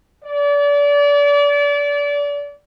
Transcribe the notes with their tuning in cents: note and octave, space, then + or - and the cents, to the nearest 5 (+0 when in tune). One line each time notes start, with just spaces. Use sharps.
D5 -30